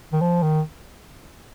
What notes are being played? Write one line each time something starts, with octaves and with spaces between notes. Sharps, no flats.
D#3
F3
D#3